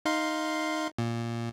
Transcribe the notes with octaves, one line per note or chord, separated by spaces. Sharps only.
D#4 F5 C6
A#2